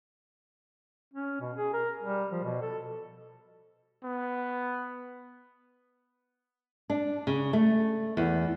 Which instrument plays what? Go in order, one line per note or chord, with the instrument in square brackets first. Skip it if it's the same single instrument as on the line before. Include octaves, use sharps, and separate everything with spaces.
[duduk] C#4
B2
G#4
A#4
G3
F3
B2
A4
[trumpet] B3
[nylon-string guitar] D4
C#3
A3
E2